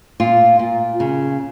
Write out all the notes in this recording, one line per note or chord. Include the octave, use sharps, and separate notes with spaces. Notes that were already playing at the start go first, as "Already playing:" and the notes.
A#2 F4
A#2
C#3